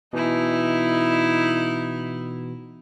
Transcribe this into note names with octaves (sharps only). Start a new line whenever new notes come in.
B2 E3 D#4 E4